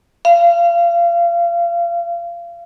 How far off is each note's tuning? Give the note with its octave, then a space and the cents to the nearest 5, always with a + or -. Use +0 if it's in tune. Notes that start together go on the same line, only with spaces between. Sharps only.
F5 -30